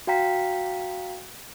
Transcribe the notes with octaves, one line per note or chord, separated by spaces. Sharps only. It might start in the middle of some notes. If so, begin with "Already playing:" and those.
F#4 F5 G5 A#5 B6